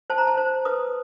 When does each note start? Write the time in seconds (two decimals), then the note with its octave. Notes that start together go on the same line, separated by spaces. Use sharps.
0.10 C5 A5
0.18 A#5
0.27 A5
0.37 C5
0.65 B4 D#6